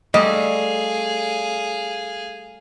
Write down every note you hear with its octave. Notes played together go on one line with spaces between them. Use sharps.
G3 A3 G#4 D#5 F5